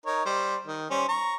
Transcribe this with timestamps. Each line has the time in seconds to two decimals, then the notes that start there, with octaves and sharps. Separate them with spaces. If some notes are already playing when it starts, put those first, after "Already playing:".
0.06 D#4 A#4 C#5
0.25 G3 C5
0.67 D#3
0.90 G3 C#4 C5
1.09 A#5 C#6